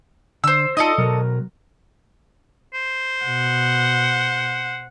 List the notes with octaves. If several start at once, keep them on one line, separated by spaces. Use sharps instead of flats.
D3 C5 E6
D#4 F4 A4 D5 D#5
B2 F#3 A#4
C5
B2 F#5